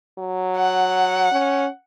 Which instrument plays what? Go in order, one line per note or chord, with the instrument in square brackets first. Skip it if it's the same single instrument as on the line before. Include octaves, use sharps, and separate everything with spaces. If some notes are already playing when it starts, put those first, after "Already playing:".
[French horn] F#3
[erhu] F#5
[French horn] C#4